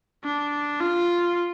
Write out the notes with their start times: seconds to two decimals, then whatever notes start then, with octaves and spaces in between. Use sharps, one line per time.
0.24 D4
0.80 F4